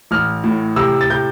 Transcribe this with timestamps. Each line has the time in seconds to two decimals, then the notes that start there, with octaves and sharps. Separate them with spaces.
0.11 A1 F6
0.44 A2
0.76 C3 E6
1.01 A6
1.10 C3 G6